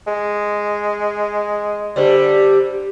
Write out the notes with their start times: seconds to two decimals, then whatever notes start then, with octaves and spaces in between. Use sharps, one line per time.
0.07 G#3
1.96 D3 G3 G4 C5 D5